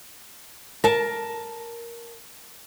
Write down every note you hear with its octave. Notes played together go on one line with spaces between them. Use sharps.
A#4 A5